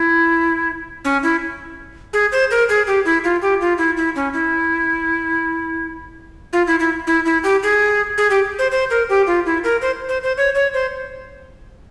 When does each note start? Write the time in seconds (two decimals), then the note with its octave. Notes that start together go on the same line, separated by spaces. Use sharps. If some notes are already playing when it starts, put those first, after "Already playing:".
Already playing: E4
1.05 C#4
1.23 E4
2.13 G#4
2.32 C5
2.51 A#4
2.69 G#4
2.87 G4
3.05 E4
3.24 F4
3.42 G4
3.61 F4
3.78 E4
3.97 E4
4.16 C#4
4.33 E4
6.53 F4
6.67 E4
6.80 E4
7.07 E4
7.25 E4
7.44 G4
7.63 G#4
8.18 G#4
8.30 G4
8.59 C5
8.72 C5
8.90 A#4
9.09 G4
9.27 F4
9.46 E4
9.64 A#4
9.82 C5
10.09 C5
10.23 C5
10.37 C#5
10.55 C#5
10.74 C5